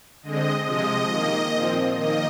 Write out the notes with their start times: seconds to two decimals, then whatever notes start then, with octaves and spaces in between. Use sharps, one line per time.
0.23 D3 G#3 C4 D#5
0.66 C3 F3 G#3 D#5
1.09 D#3 A#3
1.53 A#2 F3 C4
1.95 D#3 A#3 D#5